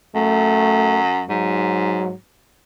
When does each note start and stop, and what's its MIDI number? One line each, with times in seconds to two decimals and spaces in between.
0.15 1.23 42
0.15 1.01 57
1.29 2.15 44
1.29 2.13 54